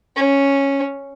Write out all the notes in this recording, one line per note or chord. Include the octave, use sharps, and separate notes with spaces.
C#4